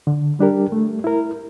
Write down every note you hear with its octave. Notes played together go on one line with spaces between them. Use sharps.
D3
G3 D4 G4 A#4
A3
E4 A#4